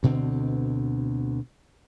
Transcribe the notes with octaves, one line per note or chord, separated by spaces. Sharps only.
D2 B2 D3 C4